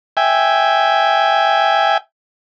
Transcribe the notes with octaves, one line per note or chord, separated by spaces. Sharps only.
E5 G5 G#5